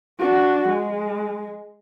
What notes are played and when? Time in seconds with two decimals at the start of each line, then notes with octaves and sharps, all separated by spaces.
0.19 D4 F#4
0.69 G#3